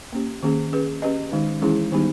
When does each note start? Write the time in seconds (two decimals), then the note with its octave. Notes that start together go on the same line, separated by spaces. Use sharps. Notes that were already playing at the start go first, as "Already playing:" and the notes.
0.13 A#3 C#4 G4
0.43 D#3 A#3 C#4 G#4
0.72 C#4 G#4 B4
1.02 C#4 G4 B4 D#5
1.32 D#3 G#3 D#4
1.62 E3 G#3 C#4 E4 G#4
1.92 D#3 G3 B3 D#4 G4